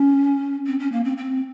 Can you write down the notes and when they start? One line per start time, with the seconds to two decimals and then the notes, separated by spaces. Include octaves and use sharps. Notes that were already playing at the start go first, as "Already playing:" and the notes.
Already playing: C#4
0.67 C4
0.79 C#4
0.92 A#3
1.04 C4
1.17 C4